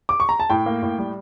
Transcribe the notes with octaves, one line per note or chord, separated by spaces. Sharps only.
D6
C#6
A#5
A5
A2 G5
A#3
A2
G3